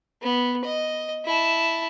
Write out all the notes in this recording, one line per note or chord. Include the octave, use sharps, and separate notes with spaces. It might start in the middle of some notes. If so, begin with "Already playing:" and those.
B3
D#5
E4 A5